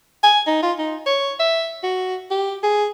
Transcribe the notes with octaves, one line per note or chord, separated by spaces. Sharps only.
G#5
D#4
F4
D#4
C#5
E5
F#4
G4
G#4